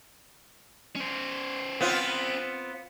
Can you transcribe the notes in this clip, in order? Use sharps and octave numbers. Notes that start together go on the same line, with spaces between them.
C#4 C5
B3 C4 F4